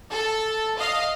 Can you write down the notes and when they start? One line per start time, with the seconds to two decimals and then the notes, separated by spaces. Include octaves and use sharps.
0.12 A4
0.79 D#5 F5